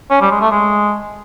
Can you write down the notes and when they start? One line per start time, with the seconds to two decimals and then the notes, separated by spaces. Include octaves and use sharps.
0.10 C#4
0.21 G3
0.31 G#3
0.41 A3
0.52 G#3